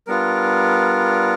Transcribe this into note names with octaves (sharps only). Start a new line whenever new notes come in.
G3 B3 D4 F4 A#4